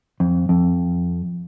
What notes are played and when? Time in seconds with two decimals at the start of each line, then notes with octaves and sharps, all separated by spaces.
0.20 F2
0.49 F2